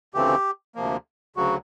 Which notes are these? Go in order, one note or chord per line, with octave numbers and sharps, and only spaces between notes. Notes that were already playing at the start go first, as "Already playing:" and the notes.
D2 C#3 E3 A3 C4 G4
D2 C3 F3 A#3
D2 C#3 F#3 F#4